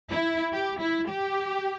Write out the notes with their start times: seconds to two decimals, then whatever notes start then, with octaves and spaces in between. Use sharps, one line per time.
0.09 E4
0.53 G4
0.80 E4
1.08 G4